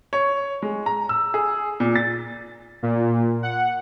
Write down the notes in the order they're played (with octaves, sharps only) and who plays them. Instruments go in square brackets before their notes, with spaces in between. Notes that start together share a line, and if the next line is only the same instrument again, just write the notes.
[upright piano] C#5
G#3
A#5
E6
G#4
A#2
A6
[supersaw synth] A#2
F#5